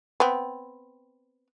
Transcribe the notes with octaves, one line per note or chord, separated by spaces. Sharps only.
B3 C4